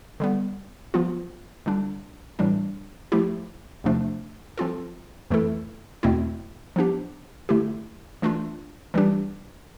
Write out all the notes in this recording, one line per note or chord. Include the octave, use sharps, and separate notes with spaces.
D3 G3 B3
F3 B3 F4
D3 G3 D4
A2 E3 G3 D4
F3 A3 E4 G4
E2 C3 F3 A3 D4
F3 C4 F4 A4
F2 E3 A3 E4 A4
E2 B2 A3 C4 E4
F3 B3 D4 G4
D3 A3 E4 G4
E3 A3 D4 F4
E3 G3 D4 G4